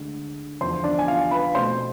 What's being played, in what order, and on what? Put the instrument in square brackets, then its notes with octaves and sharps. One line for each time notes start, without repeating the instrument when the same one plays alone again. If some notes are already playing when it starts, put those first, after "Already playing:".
Already playing: [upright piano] D2 D3 G#3
E2 D3 F3 C5 C6
D4 D5
G#5
F4 F5
B4 B5
B2 A3 C4 C5 C6